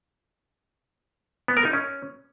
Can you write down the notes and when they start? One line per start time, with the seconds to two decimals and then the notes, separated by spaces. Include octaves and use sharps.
1.48 B3
1.57 A#4
1.65 D#4
1.73 C#4